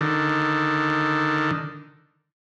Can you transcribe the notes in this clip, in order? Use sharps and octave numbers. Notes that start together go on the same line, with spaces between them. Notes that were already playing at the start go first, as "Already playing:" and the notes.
D3 D#3